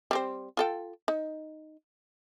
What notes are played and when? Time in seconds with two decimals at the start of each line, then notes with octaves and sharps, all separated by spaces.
0.11 G3 C4 C5
0.57 F4 A4 G5
1.08 D#4